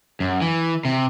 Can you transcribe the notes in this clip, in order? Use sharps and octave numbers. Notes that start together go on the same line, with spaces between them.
F#2
E3
C3